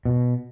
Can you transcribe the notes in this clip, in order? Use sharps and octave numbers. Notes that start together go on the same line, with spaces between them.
B2